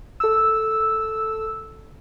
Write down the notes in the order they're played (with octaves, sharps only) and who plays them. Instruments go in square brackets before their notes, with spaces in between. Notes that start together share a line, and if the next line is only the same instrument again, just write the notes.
[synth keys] A4 E6